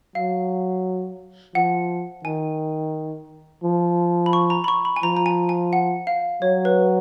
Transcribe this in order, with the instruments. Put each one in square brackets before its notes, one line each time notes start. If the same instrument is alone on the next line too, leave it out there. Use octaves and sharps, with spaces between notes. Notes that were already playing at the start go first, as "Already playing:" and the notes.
[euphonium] F#3 [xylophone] F5
[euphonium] F3 [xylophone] F#5
[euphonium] D#3 [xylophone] G#5
[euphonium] F3
[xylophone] B5
C#6
A#5
B5
C#6
B5
G#5
[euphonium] F3 [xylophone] A#5
[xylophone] A#5
G#5
G#5
F#5
F5
[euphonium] F#3 [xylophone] C#5
[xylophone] B4